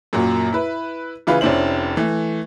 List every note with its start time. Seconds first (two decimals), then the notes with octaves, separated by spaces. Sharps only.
0.13 F#2 A#2 F#4
0.53 E4 B4
1.27 C#3 E3 F4 B4
1.41 F1 C#4 D4 E4 C5 F#7
1.97 E3 A3